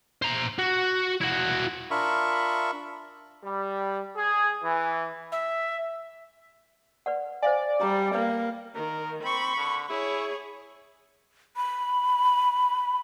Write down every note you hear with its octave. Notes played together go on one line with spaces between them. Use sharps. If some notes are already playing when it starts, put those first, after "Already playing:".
C5 A#5
F#4
E4 F#4
D4 F4 A#4 E5 B5 C#6
G3
G#4
E3
E5
B4 D5 F#5
C5 D5 F5 G#5
G3 A#5
A#3 B4
D#3 A#4
C4 B5 C#6
D3
E4 G#4 C#5
B5